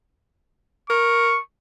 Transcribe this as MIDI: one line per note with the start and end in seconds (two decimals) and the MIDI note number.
0.90 1.35 70
0.90 1.42 85